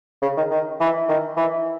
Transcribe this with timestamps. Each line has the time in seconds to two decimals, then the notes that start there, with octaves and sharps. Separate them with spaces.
0.22 C#3
0.37 D#3
0.51 D#3
0.81 E3
1.09 D#3
1.37 E3